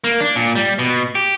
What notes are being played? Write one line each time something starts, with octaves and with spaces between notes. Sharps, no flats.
A#3
D4
A#2
G3
B2
G4